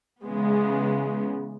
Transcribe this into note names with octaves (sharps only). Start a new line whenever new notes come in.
C#3 E3 G#3 B3